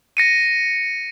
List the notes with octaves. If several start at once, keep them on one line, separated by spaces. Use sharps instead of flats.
A#6 C#7 D#7